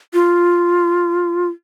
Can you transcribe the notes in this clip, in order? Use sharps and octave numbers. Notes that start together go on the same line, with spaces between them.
F4